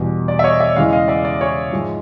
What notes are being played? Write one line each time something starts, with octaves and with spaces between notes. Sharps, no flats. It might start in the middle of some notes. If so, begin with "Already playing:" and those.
Already playing: E2 B2 G3
D5
E5
C#5 D#5
D5 E5
E2 C#3 E3 G#3 D#5 F5
D#5 F5
D5 E5
D5
C#5
G#2 F3 G#3